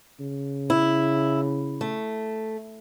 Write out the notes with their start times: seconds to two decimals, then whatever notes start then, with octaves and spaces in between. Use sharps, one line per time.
0.20 C#3
0.70 E4
1.81 A3